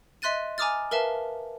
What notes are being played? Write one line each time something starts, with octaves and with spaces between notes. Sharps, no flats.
D#5 E5 C6 F#6 A6 D#7
G#5 A#5 D6 D#6 F6 A6
A#4 B4 E5 F5 A5